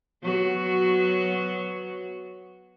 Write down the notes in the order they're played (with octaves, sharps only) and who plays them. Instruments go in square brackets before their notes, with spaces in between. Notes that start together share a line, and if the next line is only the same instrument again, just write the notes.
[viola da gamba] F#3 B3 F#4